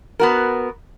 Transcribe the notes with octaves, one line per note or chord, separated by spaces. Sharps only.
B3 F#4 A#4